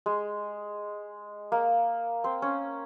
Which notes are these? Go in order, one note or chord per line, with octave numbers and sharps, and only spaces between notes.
G#3
A#3
C4
C#4